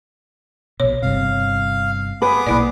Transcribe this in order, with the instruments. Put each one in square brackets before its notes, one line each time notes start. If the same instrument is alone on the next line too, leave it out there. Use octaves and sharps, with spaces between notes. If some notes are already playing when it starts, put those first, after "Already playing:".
[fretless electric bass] A#1 B2 [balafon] C#5
[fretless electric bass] G1 G2 C3 [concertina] F5
[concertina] B3 G#4 D6 [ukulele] B4
[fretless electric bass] B1 A#2 [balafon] A#3 E4 D5